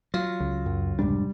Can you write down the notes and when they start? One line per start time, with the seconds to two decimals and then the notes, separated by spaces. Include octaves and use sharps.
0.14 F#3 F4
0.40 C#2
0.66 F#2
0.99 F1 G#2 G3 D4